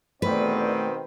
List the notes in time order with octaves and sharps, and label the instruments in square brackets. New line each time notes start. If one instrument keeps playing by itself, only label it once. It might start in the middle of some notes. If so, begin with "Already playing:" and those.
[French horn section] E2 D5 [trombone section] B2 D#3 C4 [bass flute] A3 [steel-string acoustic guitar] B4